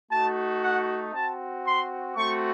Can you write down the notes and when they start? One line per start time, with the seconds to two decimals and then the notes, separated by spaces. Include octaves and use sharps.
0.10 A3 D#4 F#4 A5
0.62 F#5
1.13 C4 F#4 A5
1.65 C6
2.16 A3 C4 F#4 C#6